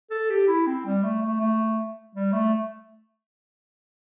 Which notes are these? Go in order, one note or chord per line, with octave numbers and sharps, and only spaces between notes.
A4
G4
E4
C4
G3
A3
A3
A3
G3
A3